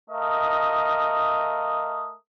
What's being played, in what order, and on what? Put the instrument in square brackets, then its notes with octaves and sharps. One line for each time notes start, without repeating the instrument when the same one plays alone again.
[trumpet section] A3 A#4 D#5 F5 D#6